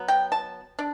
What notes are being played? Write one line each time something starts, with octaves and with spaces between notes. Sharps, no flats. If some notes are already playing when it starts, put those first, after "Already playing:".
Already playing: F#3 B3
G5
A5
D4